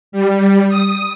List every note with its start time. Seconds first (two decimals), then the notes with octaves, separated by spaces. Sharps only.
0.12 G3
0.68 D#6